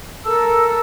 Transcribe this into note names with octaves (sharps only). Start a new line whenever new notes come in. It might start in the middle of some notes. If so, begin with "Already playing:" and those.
A4 A#4 A5 E6